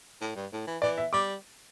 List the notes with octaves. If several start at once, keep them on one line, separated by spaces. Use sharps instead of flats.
A2
G2
A2
E3
E3 D5
E5
G3 D6